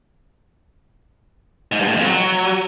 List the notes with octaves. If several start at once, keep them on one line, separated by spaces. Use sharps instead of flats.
G#2
G2
A2
F2
F#3